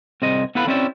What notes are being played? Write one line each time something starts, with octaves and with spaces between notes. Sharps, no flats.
C2 C4 G#4 D#5
B3 E4 A4 B4 F5 B5
C4 C#4 E4 G4 D5 E5